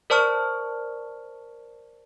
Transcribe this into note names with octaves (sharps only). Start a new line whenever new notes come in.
A#4 C5 D5 A5 C#6 F6